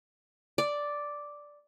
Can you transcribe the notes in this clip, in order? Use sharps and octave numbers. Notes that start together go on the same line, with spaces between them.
D5